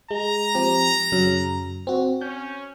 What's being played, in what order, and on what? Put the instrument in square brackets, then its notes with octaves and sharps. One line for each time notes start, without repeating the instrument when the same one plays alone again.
[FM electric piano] G#3 [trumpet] A#5
[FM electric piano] F3 C4 G4
F#2 C#3 F#3
C4 F#4
[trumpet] C#4 [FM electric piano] G6